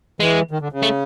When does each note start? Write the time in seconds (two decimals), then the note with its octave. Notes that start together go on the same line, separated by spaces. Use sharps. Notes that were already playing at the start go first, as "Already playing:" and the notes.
0.20 E3 G#3
0.51 D#3
0.61 D3
0.72 C#3
0.83 A3